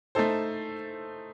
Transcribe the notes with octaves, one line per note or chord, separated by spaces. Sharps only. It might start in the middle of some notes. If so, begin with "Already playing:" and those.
A3 D#4 A4 C5